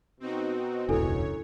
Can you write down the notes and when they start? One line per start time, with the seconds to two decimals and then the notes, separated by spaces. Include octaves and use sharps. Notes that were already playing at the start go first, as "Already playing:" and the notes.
0.20 B2 C4 D#4 F#4
0.89 E1 C#2 F#2 D4 E4 A4 C#5